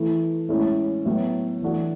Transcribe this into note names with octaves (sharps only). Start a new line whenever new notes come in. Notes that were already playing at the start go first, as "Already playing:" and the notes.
Already playing: E3 A3 E4
A2 G#3 C#4 E4
A2 F#3 B3 F#4
E3 A3 D4 F#4